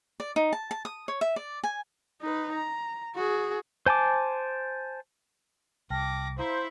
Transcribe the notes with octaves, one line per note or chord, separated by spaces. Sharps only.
D5
D#4
A5
A5
D#6
C#5
E5
D5
G#5
D#4 B4
A#5
F#4 G#4
C5 G#5 A5 D6
C2 G5 A5 D6 F6 A#6
E4 C5 E5 F5 A#5 B6